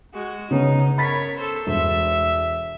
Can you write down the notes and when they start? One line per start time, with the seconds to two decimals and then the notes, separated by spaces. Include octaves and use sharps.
0.13 G#3 F#4
0.51 C#3 B3 C#4 D#4
0.98 A#4 C#5 B5 A6 B6
1.36 A4 C5
1.67 E1 E5